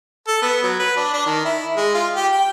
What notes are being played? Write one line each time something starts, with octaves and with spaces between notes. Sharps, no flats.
A4
B3
F#3
B4
D4
D4
D#3
E4
G#3
F4
G4
G5